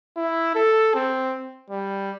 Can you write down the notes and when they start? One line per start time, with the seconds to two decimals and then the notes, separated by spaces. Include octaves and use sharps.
0.17 E4
0.55 A4
0.94 C4
1.70 G3